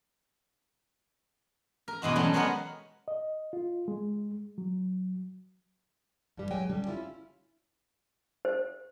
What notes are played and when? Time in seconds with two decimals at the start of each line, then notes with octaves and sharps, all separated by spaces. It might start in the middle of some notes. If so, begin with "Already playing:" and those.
1.88 A#4
2.02 B2 E3 G#3 F#4
2.16 F#3 G3 A3 C#4
2.33 G#3 B3 C#4 F#4 A#4 F#5
3.08 D#5
3.53 F4
3.88 G#3
4.58 F#3
6.37 G2 G3
6.51 F#3 G#3 G5 G#5
6.69 D3 G3 C#4
6.87 C#4 E4 F4
8.45 C5